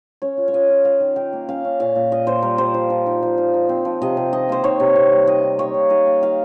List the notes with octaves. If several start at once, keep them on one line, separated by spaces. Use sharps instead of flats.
C#4 C#5
F4
C#5
F4 D#5
F4
F4 F5
D#3
D#3 G5
A#3
C#4 F5
C#4
A#2 F5
A#2
A#2 D#5
A#2 C5
G3 A#4
G3 C5
F3
F3
D#4
F3
D#4
D#4
C4
F3
C3 D#5
C3
D#3 D#5
A#3 C5
D#3 C#5
C3
C3
G3
D#3 D#5
D#4
A#3 C#5
D#4
D#4 D#5
A#3
D#3 F5